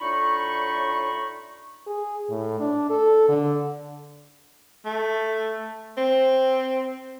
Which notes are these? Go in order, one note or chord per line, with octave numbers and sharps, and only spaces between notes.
A2 D4 D#4 F4 B5 C#6
G#4
A2
D4
A4
D3
A3
C4